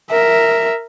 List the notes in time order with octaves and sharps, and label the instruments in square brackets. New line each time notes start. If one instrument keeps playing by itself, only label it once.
[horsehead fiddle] A#4 E5